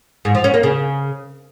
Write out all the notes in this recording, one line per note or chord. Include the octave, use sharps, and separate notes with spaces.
G#2
F3
C#4
A#3
C#3